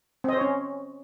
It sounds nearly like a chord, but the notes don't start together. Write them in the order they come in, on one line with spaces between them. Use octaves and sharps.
C4 D#5 C5 C#5 C#4